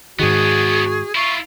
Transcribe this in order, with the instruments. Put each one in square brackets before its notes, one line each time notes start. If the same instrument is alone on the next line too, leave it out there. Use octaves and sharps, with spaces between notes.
[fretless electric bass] G#2 D#3 [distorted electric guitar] B3 D4 [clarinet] F#4 [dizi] G#4
[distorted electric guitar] E4 F4 [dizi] C#6